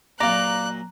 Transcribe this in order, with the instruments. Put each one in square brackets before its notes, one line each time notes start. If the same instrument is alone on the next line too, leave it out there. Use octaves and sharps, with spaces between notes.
[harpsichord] A#2 F#3 [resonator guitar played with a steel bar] D5 F5 [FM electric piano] A#5 [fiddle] F#6